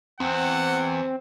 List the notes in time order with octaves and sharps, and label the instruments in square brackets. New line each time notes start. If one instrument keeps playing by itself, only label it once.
[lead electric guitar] E2 [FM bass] C4 [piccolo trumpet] F#5